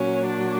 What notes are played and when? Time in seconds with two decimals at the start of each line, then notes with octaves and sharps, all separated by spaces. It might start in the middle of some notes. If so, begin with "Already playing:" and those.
Already playing: A#2 F#3 C#4
0.27 D4